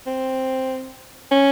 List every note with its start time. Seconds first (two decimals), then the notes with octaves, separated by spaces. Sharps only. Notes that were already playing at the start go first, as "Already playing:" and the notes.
0.06 C4
1.32 C#4